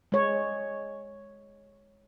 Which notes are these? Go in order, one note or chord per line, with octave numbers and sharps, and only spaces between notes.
G#3 C#5